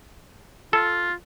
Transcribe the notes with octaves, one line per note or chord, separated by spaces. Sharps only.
F4 A4